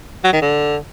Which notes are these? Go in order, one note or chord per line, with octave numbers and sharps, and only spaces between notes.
F#3
D#3
D3